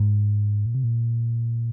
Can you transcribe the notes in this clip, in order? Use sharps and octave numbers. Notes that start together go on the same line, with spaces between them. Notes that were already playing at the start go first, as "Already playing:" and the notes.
Already playing: G#2
A#2
C3
A#2